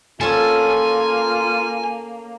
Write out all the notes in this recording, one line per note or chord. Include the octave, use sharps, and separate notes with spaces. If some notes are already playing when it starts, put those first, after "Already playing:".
A#3 C#4 F4 A4 G#5